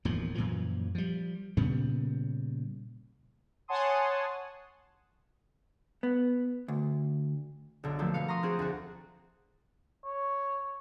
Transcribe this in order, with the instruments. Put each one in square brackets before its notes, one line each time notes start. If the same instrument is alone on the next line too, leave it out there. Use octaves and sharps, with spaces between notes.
[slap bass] E1 D#2 A2 F3
F#2 A#2 E3 F3
F3 G3
A#2 C#3 G3 B3
[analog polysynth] C#5 F#5 G#5 A5 C6 D#6
[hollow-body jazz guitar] B3
D2
[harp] B1 D3
F3 F#3 A3 A#3
B2 B4 F5 C#7
A#5 C6 C#6 D#6
C4 F4 F#4 G#4 F#5
D2 F#4
[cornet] C#5